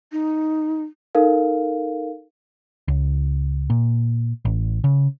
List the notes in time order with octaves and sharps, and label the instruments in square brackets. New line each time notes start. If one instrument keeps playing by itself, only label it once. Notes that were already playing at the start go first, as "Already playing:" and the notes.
[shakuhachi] D#4
[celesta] D#4 A4 A#4 F5
[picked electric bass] C#2
A#2
A1
C#3